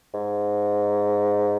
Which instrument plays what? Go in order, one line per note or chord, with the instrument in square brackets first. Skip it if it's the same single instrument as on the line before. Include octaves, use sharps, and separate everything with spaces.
[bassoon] G#2